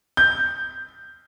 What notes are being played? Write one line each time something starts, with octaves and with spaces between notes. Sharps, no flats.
G6